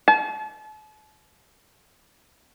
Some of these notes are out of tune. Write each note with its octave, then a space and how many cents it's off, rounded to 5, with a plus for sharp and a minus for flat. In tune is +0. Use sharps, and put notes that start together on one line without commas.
A5 -40